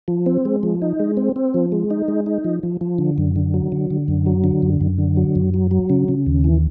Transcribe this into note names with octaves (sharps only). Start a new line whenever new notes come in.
F3
C4
G#3
F3
D#4
G#3
C4
C4
F3
G#3
D#4
G#3
D#4
F3
F3
F3
D3
F#2
D3
F#3
D3
D3
F#2
F#3
D3
F#2
F#2
D3
F#3
F#2
F#3
F#3
C#3
C#3
D#2
E3